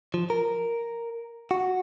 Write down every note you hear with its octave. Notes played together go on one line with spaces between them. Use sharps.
F3
A#4
F#4